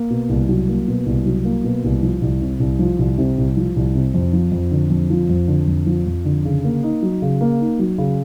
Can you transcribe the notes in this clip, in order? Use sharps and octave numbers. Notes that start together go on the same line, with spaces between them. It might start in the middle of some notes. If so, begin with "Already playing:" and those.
Already playing: A#3
B2
C2
F#3
A#3
B2
C2
F#3
A#3
B2
C2
F3
C2
C3
C2
F3
C2
C3
C2
F3
C2
C3
F2
F3
F2
D3
F2
F3
F2
D3
F2
F3
F2
D3
C#3
A#3
D#4
F#3
C#3
A#3
D#4
F#3
C#3